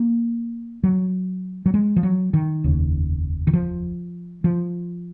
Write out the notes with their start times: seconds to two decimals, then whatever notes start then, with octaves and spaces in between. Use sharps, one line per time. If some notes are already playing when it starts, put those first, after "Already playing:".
Already playing: A#3
0.84 F#3
1.66 F#3
1.74 G#3
1.96 F3
2.03 F#3
2.34 D#3
2.64 F1 D#2 C#3
3.47 D#3
3.53 F3
4.44 F3